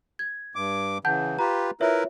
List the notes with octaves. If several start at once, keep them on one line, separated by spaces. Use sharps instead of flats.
G#6
G2 D6
C#3 E3 F#5 A5 G6
F4 G4 B4 A#5
E4 F4 A#4 B4 C#5 E5